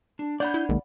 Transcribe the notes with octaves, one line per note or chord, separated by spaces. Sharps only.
D4
D4 C#5 D5 F#5 B5 G6
E4
B1 D#3 G#3 A#3